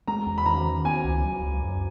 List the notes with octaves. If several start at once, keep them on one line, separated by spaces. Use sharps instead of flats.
G#3 A#5
E2
B5
D#3 A#5
D#3
B3 G#5
C#2
F#3
C#2
F#2